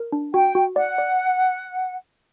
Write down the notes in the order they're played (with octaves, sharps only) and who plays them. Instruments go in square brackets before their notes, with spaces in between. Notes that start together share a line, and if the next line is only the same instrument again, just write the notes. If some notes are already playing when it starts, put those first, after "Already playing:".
Already playing: [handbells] A#4
D4
[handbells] F#4 [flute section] G5
[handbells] F#4
[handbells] D5 [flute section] F#5
[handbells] D5